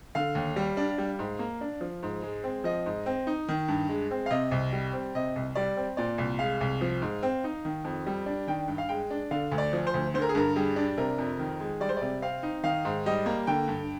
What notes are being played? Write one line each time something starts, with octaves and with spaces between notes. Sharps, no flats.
D3 F5
D#2
G3
D4
G3
G#2
A#3
D4
F3
G#2
G#3
C4
F3 D#5
G#2
C4
D#4
D#3
G2
G#3
C4
F5
C3 D#5
C2
G3
C4
C3 D#5
C2
G3 D5
C4
A#2 D5
C2
G#3 F5
C2
F3
G#2
C4
D#4
D#3
F2
G3
D4
D#3 G5
G2
F5
G#3 G5
D4
D3 F5
D2
D5
F3
C5
D2
D3 C5
A#4
G#4
G2 A#4
G3 G#4
D4
C3 A#4
F2
D#3
G#3
G3 D5
C5
C3 D5
C4 F5
D#4
D#3 F5
G#2
G3 D#5
A#3
D3 G5
G2